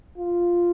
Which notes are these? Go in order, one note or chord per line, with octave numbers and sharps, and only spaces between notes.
F4